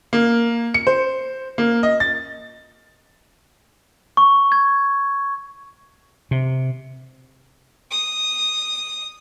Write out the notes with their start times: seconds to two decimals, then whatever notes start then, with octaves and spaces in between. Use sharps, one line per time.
0.13 A#3
0.74 C#7
0.87 C5
1.58 A#3
1.83 D#5
2.00 A6
4.17 C#6
4.52 G#6
6.31 C3
7.91 D#6